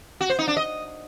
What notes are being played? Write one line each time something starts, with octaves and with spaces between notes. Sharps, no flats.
F#4
C5
D#4
D4
D#5